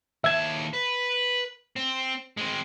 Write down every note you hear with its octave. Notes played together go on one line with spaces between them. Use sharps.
D#2 E5 A5 G#6
B4
C4
G#3 C4